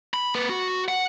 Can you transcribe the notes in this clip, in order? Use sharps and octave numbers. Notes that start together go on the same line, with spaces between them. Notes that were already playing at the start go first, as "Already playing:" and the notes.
B5
A#3 B4
F#4
F#5